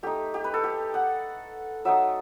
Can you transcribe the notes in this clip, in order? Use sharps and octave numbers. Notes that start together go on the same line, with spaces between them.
A3 D#4 G4
G4
B4
A4
G4
F#5
F#3 A3 D#4 E5